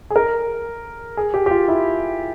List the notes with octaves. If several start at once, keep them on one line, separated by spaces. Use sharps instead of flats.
G#4
A#4
G#4
G4
G4
F4
E4